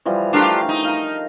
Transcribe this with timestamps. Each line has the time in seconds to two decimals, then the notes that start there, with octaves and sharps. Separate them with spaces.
0.05 E3 F3 G3
0.33 A3 D4 F4 G4 A#4
0.69 D#4
0.85 F5 A#5